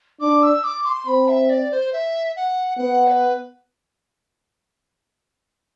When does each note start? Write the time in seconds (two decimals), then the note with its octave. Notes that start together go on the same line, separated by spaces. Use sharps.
0.21 D4 D6
0.43 E6
0.64 D6
0.85 C6
1.07 C4 B5
1.28 E5
1.50 D5
1.71 C5
1.93 E5
2.36 F#5
2.78 B3 F#5
3.07 B4